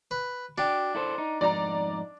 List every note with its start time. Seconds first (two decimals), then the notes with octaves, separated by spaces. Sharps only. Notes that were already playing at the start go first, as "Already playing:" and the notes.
0.11 B4
0.58 D4 F#4 G5
0.95 E4 A4 C5
1.18 D#4
1.41 F2 G#2 D#4 D5 A#5